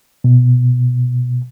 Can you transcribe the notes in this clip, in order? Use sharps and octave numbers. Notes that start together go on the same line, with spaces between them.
B2